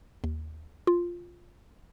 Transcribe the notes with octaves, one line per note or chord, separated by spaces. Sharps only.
D#2
F4